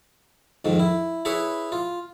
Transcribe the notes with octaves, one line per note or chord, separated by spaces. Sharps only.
F2 G#2 D#3
E4
E4 G#4 B4 C#5 E5
F4